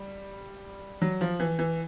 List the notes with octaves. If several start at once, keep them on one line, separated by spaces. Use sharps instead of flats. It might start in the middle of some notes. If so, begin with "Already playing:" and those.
Already playing: G3
F#3
F3
E3
E3